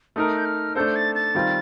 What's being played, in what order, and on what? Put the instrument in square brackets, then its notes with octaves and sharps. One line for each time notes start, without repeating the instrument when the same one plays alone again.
[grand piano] A3 D#4 A#4 [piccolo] D#6
[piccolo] G6
F6
[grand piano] A3 D4 A4 C5 [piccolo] G6
[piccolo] A6
A6
[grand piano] D#3 G3 C4 F4